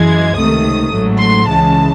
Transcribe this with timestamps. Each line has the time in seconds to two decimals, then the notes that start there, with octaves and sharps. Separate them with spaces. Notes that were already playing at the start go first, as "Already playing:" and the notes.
Already playing: F#2 E3 G#3 G#6
0.35 C#2 C3 D#3 A3 D#6
0.92 A1 G#2 F#3 A3
1.19 C6
1.48 C#2 C#3 E3 G#3 A5